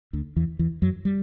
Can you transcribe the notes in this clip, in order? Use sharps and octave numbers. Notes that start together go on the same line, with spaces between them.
D2 D3
E2 E3
E2 E3
F#2 F#3
G3